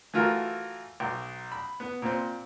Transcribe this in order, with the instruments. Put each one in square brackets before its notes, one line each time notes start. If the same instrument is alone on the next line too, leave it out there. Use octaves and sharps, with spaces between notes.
[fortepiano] E3 A3 F4 F#4 A#4
B1
B5
B3
A#2 C4